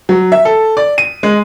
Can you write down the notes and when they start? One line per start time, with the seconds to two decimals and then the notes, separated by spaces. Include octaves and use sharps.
0.09 F#3
0.32 E5
0.45 A4
0.77 D5
0.98 D#7
1.23 G#3